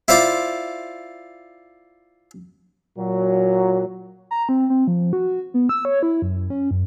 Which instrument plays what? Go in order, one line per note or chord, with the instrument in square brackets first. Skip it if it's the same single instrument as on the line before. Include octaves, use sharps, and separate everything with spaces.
[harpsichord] E4 F4 C5 D5 D6
[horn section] A#2 F#3
[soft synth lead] A#5
C4
C4
F3
F#4
B3
E6
C#5
E4
F#2
C#4
F#2